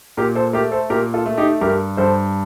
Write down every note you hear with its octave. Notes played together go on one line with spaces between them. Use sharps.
A#2 G4 A#4
A4 C5
A3 G4 A#4
A4 C5
A#2 G4 A#4
F4 A4
A3
D#4 G4
G2 G4 A#4
G2 A4 C5